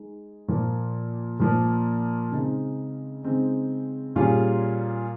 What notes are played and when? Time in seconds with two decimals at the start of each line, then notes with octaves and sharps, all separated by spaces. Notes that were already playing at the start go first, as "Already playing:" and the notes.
Already playing: G#3 D#4
0.48 A#2 F3 A#3
1.40 A#2 F3 A#3
2.32 C#3 G#3 C4 D#4
3.23 C#3 G#3 C4 D#4
4.16 A#2 G3 C#4 F4 G#4